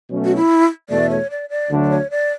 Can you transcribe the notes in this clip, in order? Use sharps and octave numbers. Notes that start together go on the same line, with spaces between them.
B2 F#3 A3 C#4
F#4
E4
E2 B2 A3 D5
C#5
D5
D5
D2 D3 F#3 A3 D4
D5
C#5
D5